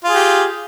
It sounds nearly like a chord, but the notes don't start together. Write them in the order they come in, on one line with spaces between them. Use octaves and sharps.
F4 G#4 G4